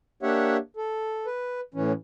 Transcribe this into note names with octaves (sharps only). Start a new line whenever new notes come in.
A#3 D4 G4 C#5 E5 F#5
A4
B4
A2 E3 C#4